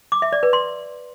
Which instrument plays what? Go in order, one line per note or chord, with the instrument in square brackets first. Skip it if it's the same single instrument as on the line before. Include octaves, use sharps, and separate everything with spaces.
[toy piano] D6
E5
D5
B4
C6